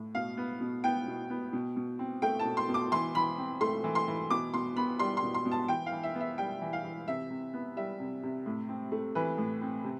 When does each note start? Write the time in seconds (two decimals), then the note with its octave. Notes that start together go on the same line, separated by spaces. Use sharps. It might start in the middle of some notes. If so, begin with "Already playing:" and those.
Already playing: A2
0.15 B2 F5
0.37 B3
0.61 B2
0.84 B3 G5
1.07 B2
1.30 B3
1.53 B2
1.76 B2
1.99 C4
2.22 A3 G5
2.39 A5
2.45 B2
2.57 C6
2.68 B2
2.74 D6
2.92 E3 C6
3.15 E3 B5
3.38 C4
3.61 A3 C6
3.84 E3
3.95 C6
4.08 E3
4.30 B2 D6
4.54 B2 C6
4.77 B3 B5
4.99 G3 C6
5.17 C6
5.22 B2
5.34 C6
5.45 B2
5.51 A5
5.68 E3 G5
5.86 F5
5.92 E3
6.03 E5
6.15 B3
6.21 E5
6.38 G3 G5
6.62 E3
6.73 F5
6.84 E3
7.08 C3 E5
7.30 C3
7.54 B3
7.77 G3 E5
8.00 C3
8.23 C3
8.46 A2
8.69 C4
8.92 A3
9.15 E3 B4
9.38 A2
9.61 C4
9.84 C3